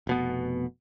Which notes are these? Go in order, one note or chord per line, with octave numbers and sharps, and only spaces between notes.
F1 B2 B3